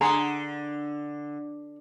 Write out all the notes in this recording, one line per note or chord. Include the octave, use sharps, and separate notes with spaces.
D3 G#4 F#5 A#5 C6